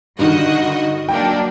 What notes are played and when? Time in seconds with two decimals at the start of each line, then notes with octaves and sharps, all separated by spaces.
0.19 G2 D3 D#3 F#4 D#5
1.09 F#3 A#3 D4 G5